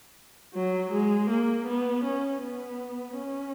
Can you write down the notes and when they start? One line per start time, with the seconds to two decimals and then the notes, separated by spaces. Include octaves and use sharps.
0.55 F#3
0.92 G#3
1.30 A#3
1.67 B3
2.04 C#4
2.42 B3
3.17 C#4